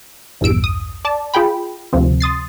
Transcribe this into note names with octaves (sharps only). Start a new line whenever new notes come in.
A#1 E2 G2 E6 D7
D#6
D5 A5
F4 G#4 G5 B5
D2 C3 F3 C4
C6 D#6 A6 C7